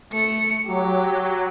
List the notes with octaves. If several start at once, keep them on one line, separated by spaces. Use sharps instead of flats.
A3 C#7
F#3 G4